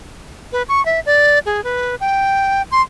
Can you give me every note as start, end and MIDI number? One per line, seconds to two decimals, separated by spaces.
0.52 0.63 71
0.69 0.84 85
0.86 1.00 76
1.06 1.39 74
1.46 1.63 68
1.64 1.95 71
2.00 2.62 79
2.72 2.81 84